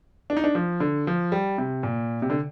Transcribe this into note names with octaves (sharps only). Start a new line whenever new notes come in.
D4
D#4
D4
F3
D3
F3
G3
C3
A#2
C3
D3